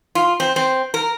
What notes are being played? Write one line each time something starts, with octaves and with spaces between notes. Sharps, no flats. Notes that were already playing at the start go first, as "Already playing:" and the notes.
F4
C4
C4
A#4